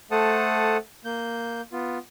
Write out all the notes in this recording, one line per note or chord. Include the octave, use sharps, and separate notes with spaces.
A3 A4 C5 F#5 A5 D#6
A#3 G6
B3 F4